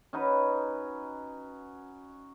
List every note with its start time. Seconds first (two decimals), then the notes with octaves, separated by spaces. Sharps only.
0.13 C#4 D#4 F#4 B4